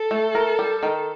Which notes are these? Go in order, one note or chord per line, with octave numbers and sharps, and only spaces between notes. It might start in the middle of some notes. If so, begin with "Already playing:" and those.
Already playing: A4
A3
A#4
G3
D#3